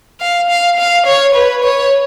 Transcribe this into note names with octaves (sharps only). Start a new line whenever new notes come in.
F5
F5
F5
C#5
B4
C#5